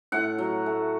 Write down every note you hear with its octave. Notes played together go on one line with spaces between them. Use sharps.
A2 F#5
F#3
A3